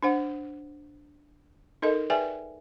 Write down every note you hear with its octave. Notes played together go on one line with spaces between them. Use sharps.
D4 C5 F#5
D#4 A4 A#4 D#5
G#4 B4 D5 E5 G5 G#5